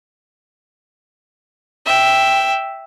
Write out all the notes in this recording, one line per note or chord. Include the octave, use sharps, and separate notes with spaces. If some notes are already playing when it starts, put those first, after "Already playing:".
E5 G5